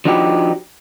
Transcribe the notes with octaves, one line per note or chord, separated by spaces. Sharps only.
F3 D4 D#4 F#4 G4